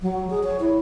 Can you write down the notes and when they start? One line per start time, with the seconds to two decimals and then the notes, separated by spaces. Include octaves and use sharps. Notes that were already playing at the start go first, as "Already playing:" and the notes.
0.02 F#3
0.30 G#4
0.43 C#5
0.60 E4